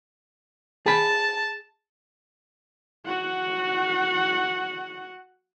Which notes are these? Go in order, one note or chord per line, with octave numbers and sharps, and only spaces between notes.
G#4 A5 B5
F#4 F#5